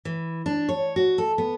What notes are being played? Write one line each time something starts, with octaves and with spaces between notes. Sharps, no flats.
E3
D4
C#5
F#4
A4
B3